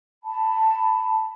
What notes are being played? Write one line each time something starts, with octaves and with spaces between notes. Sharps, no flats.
A5 B5